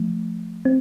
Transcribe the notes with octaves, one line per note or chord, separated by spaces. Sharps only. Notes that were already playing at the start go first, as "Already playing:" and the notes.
Already playing: F3 A3
C4